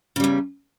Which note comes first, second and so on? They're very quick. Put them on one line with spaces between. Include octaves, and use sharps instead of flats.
C#3 G3 E2